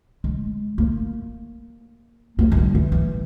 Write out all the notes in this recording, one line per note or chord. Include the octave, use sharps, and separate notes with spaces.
G#3
A#3
A#3
G#3
G3
E3
E3